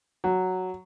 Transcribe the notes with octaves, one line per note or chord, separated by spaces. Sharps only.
F#3